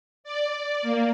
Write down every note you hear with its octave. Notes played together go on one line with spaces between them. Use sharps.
D5
A#3